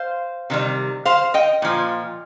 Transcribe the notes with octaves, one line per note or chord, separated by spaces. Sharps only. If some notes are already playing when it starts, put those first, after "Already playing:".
Already playing: C5 F5
C3 D#3 G3
C5 F5
D#5 G5
A#2 F3